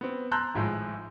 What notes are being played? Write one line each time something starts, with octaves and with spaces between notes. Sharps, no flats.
B3 C4
A5 A#5 C6 E6 F#6 G6
G#1 A2 F3 G#3